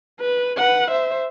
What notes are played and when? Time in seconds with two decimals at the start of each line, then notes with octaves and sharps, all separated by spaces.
0.20 B4
0.58 B4 F#5
0.91 C5 E5